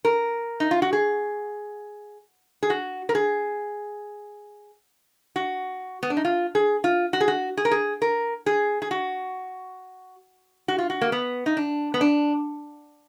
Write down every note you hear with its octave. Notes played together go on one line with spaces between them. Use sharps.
A#4
D#4
F4
F#4
G#4
G#4
F#4
A#4
G#4
F#4
B3
D4
D#4
F4
G#4
F4
F#4
G#4
F#4
G#4
A#4
G#4
A#4
G#4
G#4
F#4
F#4
F4
F#4
A#3
B3
D#4
D4
B3
D4